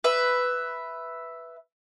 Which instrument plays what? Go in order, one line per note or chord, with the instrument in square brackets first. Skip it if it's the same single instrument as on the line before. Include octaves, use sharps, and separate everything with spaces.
[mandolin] B4 E5